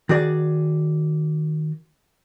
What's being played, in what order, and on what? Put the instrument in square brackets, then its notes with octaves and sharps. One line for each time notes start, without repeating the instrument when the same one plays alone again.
[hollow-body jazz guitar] D#3 F#4 G#4 D5